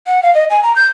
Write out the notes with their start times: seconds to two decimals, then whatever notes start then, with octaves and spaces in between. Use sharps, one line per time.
0.07 F#5
0.23 F5
0.35 D#5
0.50 G#5
0.63 A#5
0.76 G6